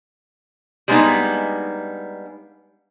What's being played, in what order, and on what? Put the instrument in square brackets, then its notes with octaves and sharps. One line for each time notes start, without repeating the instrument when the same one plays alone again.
[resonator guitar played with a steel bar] G3 G#3 A#3 B3 D4 D#4